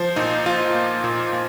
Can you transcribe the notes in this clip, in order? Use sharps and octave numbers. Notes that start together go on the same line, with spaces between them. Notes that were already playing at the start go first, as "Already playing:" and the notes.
Already playing: F3 C5
A#2 D#4
F3 F4
A#3
A#2
A#2